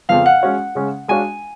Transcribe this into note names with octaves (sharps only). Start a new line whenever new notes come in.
F2 C#3 F3 B3 F5
F#5
G#3 C#4 F#4 C#5 F5
C#3 G#3 C#4
G#3 D4 F#4 C#5 F5 G#5